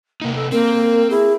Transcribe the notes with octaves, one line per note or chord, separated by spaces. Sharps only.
C3 A#3 D#4
A4
A#3 C4 A#4
E4 G#4